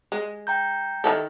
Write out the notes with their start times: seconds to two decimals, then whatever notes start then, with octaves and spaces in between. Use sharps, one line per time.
0.12 G#3
0.47 G5 A#5 G6
1.04 D#3 E4 A4